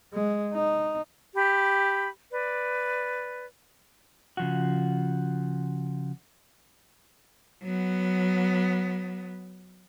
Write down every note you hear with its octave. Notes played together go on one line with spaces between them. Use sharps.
G#3
D#4
G4 B5
B4 D5
C#3 F3 F#4
F#3 B3